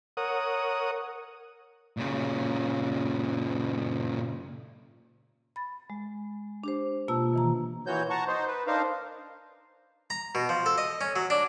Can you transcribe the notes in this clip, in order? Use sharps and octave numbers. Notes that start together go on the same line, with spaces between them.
A#4 C#5 F#5 D#6
A#2 C#3
B5 A6
G#3
D4 G4 C5
B2 A#3 F4 A5 E6
D#3 E3 A#5
A#2 E3 F#4 C#5 G6
F#5 A5 A#5 C#6
D#4 C5
B4
D4 D#4 A#4 C5 F5
A#5
B2
F3
A4
D#5
C#4
F#3
D4